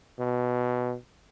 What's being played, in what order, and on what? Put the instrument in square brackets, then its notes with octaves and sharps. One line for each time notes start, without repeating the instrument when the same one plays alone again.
[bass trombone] B2